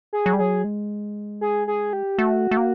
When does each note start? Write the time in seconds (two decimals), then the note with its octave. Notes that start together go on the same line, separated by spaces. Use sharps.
0.13 G#4
0.26 F#3
0.33 G3
0.39 F#3 G#4
0.64 G#3
1.41 G#4
1.68 G#4
1.93 G4
2.18 A3 F#4
2.51 A3
2.57 A#3